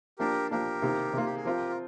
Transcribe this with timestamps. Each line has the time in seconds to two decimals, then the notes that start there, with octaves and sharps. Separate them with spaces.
0.19 F3 A#3 D4 G4 A#4
0.51 F3 A#3 D4 G4 A#4
0.82 C3 D#3 A#3
1.13 C3 D#3 A#3 F4
1.25 G4
1.36 G#4
1.45 F3 C4 F4 G4 A#4
1.69 F4